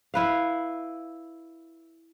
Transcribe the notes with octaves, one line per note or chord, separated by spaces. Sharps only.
E4 B4 F5